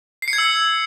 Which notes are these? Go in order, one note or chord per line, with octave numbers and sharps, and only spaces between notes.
C7
C#7
G#6
E6